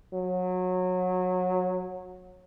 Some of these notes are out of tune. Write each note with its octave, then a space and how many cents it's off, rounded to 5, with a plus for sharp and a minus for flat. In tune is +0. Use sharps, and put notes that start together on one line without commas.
F#3 -20